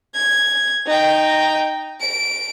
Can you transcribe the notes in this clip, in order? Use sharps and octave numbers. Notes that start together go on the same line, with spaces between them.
G#6
D#4 G5
D7